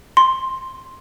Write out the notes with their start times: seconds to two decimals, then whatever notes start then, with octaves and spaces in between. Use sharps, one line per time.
0.17 C6